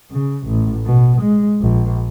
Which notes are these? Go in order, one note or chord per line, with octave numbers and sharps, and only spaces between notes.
C#3
A1
B2
G#3
A#1